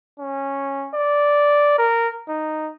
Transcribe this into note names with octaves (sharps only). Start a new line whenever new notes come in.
C#4
D5
A#4
D#4